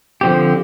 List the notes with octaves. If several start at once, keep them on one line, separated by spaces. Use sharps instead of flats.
D3 F3 C4 G4